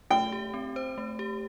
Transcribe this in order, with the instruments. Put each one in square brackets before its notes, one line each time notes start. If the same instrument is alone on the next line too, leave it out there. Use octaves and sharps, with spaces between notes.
[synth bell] A3 [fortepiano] G5
[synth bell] G4
C4
C5
A3
G4